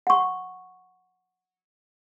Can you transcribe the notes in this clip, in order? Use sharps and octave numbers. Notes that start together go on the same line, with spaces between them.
F#5 C#6